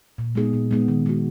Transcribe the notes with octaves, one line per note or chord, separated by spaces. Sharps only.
A#2
G#3 B3 D#4 G#4
A#2
G#3 B3 D#4 G#4
D#3
G#3 B3 F#4